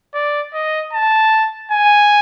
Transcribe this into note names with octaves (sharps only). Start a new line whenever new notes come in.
D5
D#5
A5
G#5